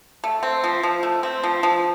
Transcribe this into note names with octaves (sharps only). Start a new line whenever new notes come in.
A3
C4
F3
F3
A3
C4
F3
F3